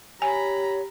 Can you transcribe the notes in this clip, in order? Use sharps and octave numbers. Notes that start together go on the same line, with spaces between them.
G4 C#5 G#5 A#5 B5